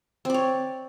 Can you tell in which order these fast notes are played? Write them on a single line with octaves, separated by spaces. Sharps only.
C4 D5 C#5